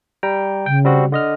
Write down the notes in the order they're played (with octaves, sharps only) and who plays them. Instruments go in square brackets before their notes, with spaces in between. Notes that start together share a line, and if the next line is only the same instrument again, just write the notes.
[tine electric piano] G3 G5 A#5
[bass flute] C#3 [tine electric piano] G5
[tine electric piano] G3 C4 F#4
D3 D#5 F6